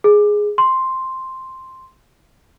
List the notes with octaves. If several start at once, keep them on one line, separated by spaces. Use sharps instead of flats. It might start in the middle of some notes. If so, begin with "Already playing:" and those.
G#4
C6